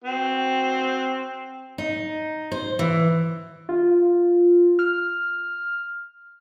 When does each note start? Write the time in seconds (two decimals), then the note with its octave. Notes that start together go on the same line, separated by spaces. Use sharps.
0.04 C4 F#4
1.78 D#4
2.52 C5
2.79 E3
3.69 F4
4.79 F6